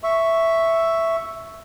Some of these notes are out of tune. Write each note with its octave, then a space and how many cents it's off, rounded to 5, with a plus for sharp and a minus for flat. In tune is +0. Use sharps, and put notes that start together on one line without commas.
E5 +0 C#6 +0